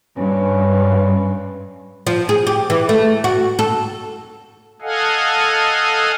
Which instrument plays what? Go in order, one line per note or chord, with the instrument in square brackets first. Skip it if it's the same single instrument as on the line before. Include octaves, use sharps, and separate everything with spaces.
[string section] G2 [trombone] C#4 [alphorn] B4
[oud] F3
G#4
G4
E3
A3
F#4
A4
[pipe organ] A4 D#5 F5 F#5 G#5